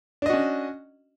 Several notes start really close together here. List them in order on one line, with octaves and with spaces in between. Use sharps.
D4 D#5 F#4 C#4